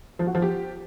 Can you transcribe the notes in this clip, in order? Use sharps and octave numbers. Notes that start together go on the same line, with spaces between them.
F3
F#4
F3
G4